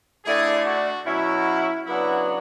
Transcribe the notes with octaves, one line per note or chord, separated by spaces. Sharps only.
D3 A3 D4 E4 G#4
F#4
B2 F#3 C#4 E4
C#3 F#3 B3 D4 E4